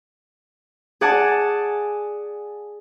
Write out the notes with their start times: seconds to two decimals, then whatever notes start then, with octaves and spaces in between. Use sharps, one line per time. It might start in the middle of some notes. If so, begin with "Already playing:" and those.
1.01 G#4 D5 F#5 G#5 A5